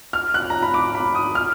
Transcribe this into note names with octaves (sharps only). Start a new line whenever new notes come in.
F6
F#6
A#5
B5
D6
B5
D#6
F6